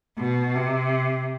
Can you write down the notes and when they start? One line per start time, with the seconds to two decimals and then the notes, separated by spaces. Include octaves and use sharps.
0.18 B2
0.55 C3